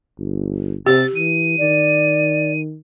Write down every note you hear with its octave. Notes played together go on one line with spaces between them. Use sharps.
G1
C3 G4 A6
E3 D#7
D#3 D5